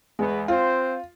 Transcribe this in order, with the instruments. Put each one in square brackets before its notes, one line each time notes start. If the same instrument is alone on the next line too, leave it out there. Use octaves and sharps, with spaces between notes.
[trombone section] E2 B3 [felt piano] G#3
[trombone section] C4 C5 [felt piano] F4